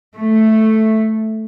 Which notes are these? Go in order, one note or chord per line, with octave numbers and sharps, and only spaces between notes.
A3